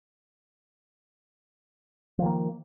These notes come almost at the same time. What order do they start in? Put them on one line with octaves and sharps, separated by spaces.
F3 D#3 A#3